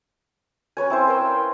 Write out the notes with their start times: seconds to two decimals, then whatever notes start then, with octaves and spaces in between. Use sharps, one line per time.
0.77 C#4 B4 C#5 G#5
0.90 C4 E4 C5
1.07 A#4 B4 F5 G5